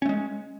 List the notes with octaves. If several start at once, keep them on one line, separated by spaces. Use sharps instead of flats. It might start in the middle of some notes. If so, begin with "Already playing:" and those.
G#3 A3 C#4